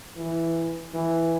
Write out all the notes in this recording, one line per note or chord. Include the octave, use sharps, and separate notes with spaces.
E3
E3